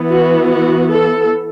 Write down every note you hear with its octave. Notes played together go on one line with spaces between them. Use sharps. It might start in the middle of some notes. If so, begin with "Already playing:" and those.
Already playing: E3 B3
F#4
F#4
A4